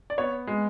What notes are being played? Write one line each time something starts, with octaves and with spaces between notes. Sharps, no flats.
D5
B3 C#5
G#3